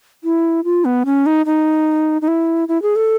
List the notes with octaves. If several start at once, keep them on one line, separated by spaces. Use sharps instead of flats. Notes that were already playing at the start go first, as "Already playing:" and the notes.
E4
F4
B3
C#4
D#4
D#4
D#4
E4
E4
G#4
A4